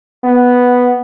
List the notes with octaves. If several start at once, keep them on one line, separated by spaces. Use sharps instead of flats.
B3